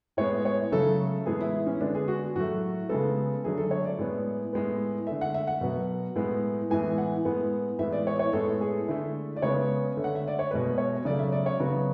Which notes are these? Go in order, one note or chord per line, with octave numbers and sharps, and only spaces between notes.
A2 G#3 B3 C#5
C#5
C#3 F#3 A3 A4
A2 E3 G#3 B3 G#4
E4
C#4
D3 G#3 B3 D4
G#4
F#4
A2 F#3 A3 F#4
C#3 G#3 B3 A4
D3 F#3 A3 G#4
A4
C#5
D5
A2 G#3 B3
A2 G#3 B3
D3 A3 E5
F#5
E5
F#5
B2 F#3 B3
A2 G#3 B3
A2 E3 G#3 B3 G#5
F#5
A2 G#3 B3
A2 E3 G#3 B3 E5
D5
C#5
C#5
A2 G#3 B3 A4
G#4
D3 A3 E4
D5
C#3 G#3 B3 C#5
D3 A3
F#5
E5
D5
C#5
B2 G#3 B3 B4
C#5
C#3 F#3 A3 D5
E5
D5
C#5
C#3 F#3 B3 F#4